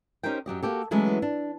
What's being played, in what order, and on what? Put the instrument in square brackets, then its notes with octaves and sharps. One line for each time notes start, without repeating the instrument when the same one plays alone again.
[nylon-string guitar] C#4 D#4 G4 A#4 C5 G5
F#2 F#3 G4 D#5
A#3 F#4 G4 A4
E3 F#3 G#3 A3 B3 C#4
D4